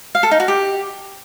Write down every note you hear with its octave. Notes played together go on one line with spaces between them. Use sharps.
F5
A4
D#4
F#4
G4